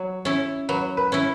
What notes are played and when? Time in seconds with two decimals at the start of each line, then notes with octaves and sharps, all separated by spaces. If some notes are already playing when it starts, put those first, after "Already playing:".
Already playing: F#3 C#5
0.25 C#4 E4
0.69 F#3 B4
0.97 B4
1.12 C#4 E4